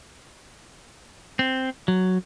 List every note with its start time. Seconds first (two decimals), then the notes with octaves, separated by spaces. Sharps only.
1.39 C4
1.88 F#3